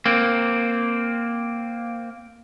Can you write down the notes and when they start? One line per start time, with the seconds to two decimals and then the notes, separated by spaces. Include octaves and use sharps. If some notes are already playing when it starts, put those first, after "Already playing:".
0.06 A#3 C4